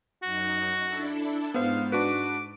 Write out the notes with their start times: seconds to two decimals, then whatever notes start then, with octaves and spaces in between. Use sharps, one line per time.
0.22 F#2 D#4 F#4
0.85 D4 E4 A4
1.54 G#2 B3 C5 F5
1.92 D4 F#4 B4 D6